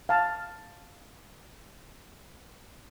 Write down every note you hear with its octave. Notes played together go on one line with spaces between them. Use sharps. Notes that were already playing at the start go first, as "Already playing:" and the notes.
F5 A5